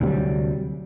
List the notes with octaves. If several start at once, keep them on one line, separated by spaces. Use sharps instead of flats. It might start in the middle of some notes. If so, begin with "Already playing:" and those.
D2 C3 F#3 G3